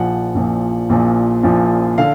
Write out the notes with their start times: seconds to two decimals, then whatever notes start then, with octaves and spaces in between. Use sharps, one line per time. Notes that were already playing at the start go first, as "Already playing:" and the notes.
Already playing: A#1 A#2 F3 F#5
0.35 A#1 A#2 F3
0.89 A#1 A#2 F3
1.43 A#1 A#2 F3
1.98 D3 F5